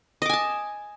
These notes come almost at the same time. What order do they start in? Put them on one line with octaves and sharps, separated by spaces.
D#5 D6 G#5 A5